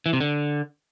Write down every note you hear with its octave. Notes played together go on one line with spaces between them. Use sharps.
E3
C3
D3